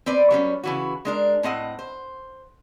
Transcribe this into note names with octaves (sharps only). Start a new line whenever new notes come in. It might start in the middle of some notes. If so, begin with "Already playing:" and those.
C4 B4 D5
F#3 G3 C#4
C#3 E3 F#4
G#3 D4 A#4
A2 C4 D#5 F#5
C5